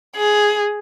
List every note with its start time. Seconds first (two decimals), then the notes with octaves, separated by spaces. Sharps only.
0.16 G#4